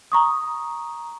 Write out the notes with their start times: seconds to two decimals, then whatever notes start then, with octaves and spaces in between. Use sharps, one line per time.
0.12 A#5 C#6 D#6